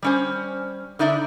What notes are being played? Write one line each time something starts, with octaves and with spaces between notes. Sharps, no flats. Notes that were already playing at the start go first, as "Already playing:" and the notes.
G3 C#4 C5
D3 D#4 E4 D5 E5